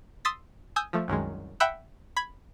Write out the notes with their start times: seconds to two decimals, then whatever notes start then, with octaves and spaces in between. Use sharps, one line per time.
0.25 C6 D#6 E6 A6 B6
0.76 G#5 D#6 E6 G6
0.93 F3 A3
1.08 C2 F#2 D#3 G#3
1.60 E5 F#5 G5 B5 E6 F#6
2.17 B5 G#6